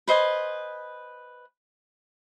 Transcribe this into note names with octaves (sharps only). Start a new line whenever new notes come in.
B4 C5 D#5 G#5